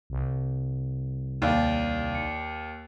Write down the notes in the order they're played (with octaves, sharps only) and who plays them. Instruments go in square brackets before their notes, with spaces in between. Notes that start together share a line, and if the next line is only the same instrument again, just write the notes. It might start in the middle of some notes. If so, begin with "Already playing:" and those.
[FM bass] C2
[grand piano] D#2 [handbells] D#4 D5 F5
[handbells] C#7